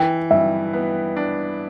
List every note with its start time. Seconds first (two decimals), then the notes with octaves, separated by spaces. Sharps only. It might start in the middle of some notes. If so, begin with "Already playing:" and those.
Already playing: E3 G5
0.31 G2 E5
0.73 B3
1.16 D4